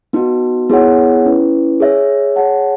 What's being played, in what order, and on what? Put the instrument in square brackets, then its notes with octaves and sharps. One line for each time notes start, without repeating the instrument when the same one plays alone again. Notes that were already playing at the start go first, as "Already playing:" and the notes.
[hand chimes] B3 D#4 F#4
B3 E4 G#4 C#5 F#5
C#4 E4 B4
G#4 C#5 E5
G#4 C#5 F#5 A5